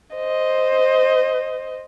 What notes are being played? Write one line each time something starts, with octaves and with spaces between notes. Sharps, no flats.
C5 D#5